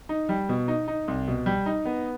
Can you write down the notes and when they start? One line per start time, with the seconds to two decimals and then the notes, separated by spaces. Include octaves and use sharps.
0.09 D#4
0.29 G3
0.49 B2
0.68 D#4
0.88 D#4
1.08 C2
1.28 B2
1.46 G3
1.66 D#4
1.85 B3